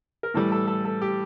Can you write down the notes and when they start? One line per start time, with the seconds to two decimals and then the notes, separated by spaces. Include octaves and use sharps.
0.23 A#4
0.34 A2 E3 G3 A4
0.52 A4
0.67 A4
0.85 A4
1.02 G4